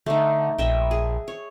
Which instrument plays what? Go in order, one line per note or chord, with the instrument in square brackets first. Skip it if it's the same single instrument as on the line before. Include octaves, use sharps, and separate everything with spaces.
[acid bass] D3 [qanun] A3 D#4
[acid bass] A#1 [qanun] D#5 E5 G5
[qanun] G#4
C#5